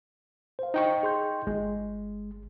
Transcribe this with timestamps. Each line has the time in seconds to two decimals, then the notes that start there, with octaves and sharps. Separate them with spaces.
0.59 C5 F5
0.74 D#4 G5 C#6
1.03 G#4 C6 G6
1.47 G1 G#3